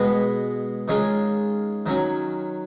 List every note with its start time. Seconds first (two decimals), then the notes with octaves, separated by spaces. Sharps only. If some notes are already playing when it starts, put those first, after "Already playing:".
Already playing: B2 G#3 B3
0.88 D#3 G#3 C#4 F4
1.86 D#3 F#3 C#4